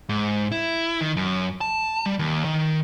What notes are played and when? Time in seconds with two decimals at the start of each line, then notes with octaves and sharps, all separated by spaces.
0.09 G#2
0.52 E4
1.01 D#3
1.17 F#2
1.61 A5
2.06 G3
2.19 D#2
2.45 D#3